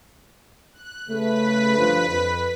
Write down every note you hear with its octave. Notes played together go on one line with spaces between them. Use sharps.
F#6
C#3 A3 B4 B6
G2 D3 F3
F2